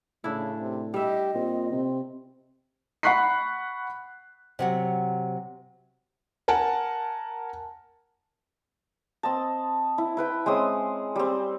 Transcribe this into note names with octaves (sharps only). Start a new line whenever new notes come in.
A2 C#3 D4 E4
C3
G3 G4 D#5 E5
A#2 C4
C3 C4
F#5 B5 C#6 F#6 B6 C7
C3 F#3 F#5
A#4 F#5 G#5 A5
C4 D#5 A5
E4
E4 B4 G5
G#3 C4 C#4 D#6
G3 C4